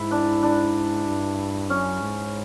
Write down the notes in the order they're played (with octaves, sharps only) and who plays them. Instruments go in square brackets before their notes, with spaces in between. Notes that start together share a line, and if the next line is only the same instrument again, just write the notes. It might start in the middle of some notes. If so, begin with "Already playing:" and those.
Already playing: [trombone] G#2 [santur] E4
[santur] D4
D4
[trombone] G2
[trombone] F#2 [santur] C#4
[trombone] G#2